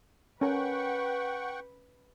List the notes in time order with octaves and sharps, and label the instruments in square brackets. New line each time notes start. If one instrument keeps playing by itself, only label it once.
[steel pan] C#4 A#4 [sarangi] B4 [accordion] F#5 G5 C#6